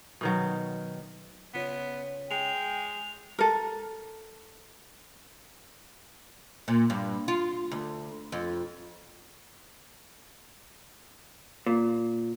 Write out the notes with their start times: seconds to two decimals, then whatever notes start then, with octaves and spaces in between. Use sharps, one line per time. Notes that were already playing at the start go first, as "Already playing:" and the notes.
0.21 B2 D#3 F#3
1.54 C#3 B3 F4 C#5
2.31 G#3 G5 F7
3.39 A4 A#4
6.68 A#2
6.90 G2
7.28 F4
7.71 D2
8.32 F2
11.66 A#2